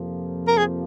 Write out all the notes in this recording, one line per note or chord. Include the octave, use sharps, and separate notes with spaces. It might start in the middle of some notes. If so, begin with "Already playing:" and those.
Already playing: F2 C3 F3 A#3
A#4
G#4